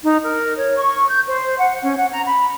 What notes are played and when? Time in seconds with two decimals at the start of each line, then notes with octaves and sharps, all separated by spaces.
0.03 D#4
0.23 A#4
0.56 C#5
0.76 C#6
1.08 G6
1.27 C5
1.58 F#5
1.82 C#4
1.96 F#5
2.10 A#5
2.27 B5